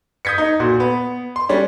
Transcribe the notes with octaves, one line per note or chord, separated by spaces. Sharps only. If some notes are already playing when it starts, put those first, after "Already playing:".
D#6 G6 G#6 B6 C#7
D#4
A#2 F#4
B3
C6
G3 C#4 D4